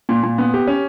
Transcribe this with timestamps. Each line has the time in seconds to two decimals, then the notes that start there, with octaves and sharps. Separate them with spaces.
0.09 A#2
0.23 A#2
0.38 B3
0.54 G4
0.67 C#4